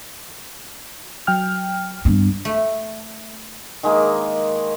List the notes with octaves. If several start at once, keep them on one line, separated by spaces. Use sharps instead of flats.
F#3 G5 F6
G2 B3
A3
D#3 G#3 A#3